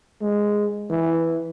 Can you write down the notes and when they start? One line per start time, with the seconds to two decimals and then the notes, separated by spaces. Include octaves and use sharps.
0.21 G#3
0.90 E3